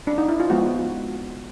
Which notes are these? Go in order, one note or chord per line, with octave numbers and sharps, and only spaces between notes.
D4
D#4
E4
F4
F3 G#3 B3 F#4